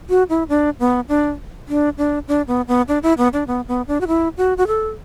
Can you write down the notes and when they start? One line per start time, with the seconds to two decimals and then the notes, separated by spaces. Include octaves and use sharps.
0.09 F#4
0.29 E4
0.49 D4
0.79 B3
1.09 D4
1.68 D4
1.98 D4
2.28 D4
2.48 B3
2.68 B3
2.88 D4
3.03 E4
3.18 B3
3.33 D4
3.47 B3
3.68 B3
3.88 D4
4.01 F#4
4.08 E4
4.37 F#4
4.57 F#4
4.67 A4